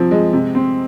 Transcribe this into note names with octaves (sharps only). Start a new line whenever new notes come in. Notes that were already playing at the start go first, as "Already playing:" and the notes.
Already playing: C3 F3 C4
G#3
C3
C4